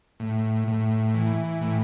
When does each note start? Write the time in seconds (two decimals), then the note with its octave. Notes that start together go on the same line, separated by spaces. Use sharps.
0.20 A2
0.68 A2
1.14 E3
1.61 A2